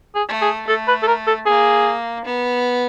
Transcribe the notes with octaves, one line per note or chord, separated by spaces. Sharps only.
G#4
A3
G#4
A3 A4
B4
A4
A#4
A4
A#3 G#4
B3